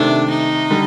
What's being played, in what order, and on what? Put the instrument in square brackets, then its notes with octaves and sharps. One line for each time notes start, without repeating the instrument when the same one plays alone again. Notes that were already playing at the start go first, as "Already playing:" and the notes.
Already playing: [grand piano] C3 D#3 A3 [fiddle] D4
[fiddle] D#4
[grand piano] D3 G3